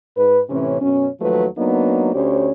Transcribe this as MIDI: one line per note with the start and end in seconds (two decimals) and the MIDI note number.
0.16 0.40 44
0.16 0.40 71
0.49 0.78 45
0.49 0.78 48
0.49 0.78 52
0.49 0.78 61
0.81 1.07 42
0.81 1.07 47
0.81 1.07 61
1.20 1.45 39
1.20 1.45 53
1.20 1.45 54
1.20 1.45 57
1.20 1.45 71
1.57 2.12 54
1.57 2.12 58
1.57 2.12 59
1.57 2.12 62
1.57 2.12 63
2.14 2.52 38
2.14 2.52 61
2.14 2.52 67
2.14 2.52 72
2.14 2.52 73